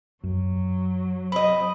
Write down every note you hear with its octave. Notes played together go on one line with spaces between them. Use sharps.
F#2 F#3
C4 D#5 B5